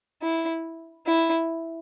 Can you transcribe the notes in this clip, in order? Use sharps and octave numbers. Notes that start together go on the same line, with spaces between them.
E4
E4